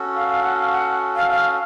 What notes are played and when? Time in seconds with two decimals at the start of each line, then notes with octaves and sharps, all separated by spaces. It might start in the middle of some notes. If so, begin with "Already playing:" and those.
Already playing: C#4 F#4 A4
0.16 F5
0.29 F5
0.44 F#5
0.57 F5
0.72 F#5
1.16 F5
1.31 F5